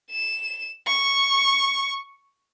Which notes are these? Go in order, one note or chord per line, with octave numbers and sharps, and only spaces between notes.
E7
C#6